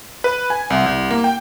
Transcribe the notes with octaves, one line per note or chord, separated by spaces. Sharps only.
B4
G#5
C2
C2
A#3
G5